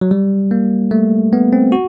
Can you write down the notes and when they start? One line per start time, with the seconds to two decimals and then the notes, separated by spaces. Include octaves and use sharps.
0.01 F#3
0.11 G3
0.51 A#3
0.91 A3
1.33 B3
1.53 C4
1.72 F#4